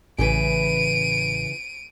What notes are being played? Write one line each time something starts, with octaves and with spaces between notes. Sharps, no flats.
A1 C#3 E3 B4 D7 D#7